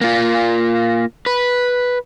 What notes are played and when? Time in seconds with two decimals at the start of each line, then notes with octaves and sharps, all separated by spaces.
0.01 A#3 F4
1.26 B4